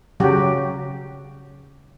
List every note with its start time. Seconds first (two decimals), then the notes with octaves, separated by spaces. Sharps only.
0.20 C#3 F#3 F#4 G4